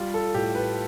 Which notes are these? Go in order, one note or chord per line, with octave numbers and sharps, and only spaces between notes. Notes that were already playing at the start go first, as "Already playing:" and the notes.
Already playing: G3 F4
A4
A2 G4
B4